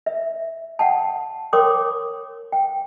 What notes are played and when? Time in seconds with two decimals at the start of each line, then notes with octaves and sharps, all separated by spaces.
0.06 E5
0.79 F#5 G5 A5
1.53 A#4 C#5 G5 C6 D6 D#6
2.52 G5